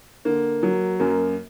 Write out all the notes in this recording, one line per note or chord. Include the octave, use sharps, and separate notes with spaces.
D3 A#3
F#3
F#2 A#3